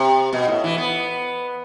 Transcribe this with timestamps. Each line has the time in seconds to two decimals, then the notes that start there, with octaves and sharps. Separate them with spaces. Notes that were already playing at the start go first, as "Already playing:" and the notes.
Already playing: C3
0.33 B2
0.48 A2
0.64 E3
0.78 B3